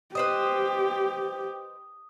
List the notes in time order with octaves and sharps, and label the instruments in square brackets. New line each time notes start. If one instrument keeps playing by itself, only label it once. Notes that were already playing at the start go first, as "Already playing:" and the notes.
[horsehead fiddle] G4 [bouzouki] B4 C5 D#5 [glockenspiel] D#6